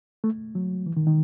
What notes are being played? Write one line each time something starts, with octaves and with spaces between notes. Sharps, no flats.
A3
F#3
E3
D#3
D#3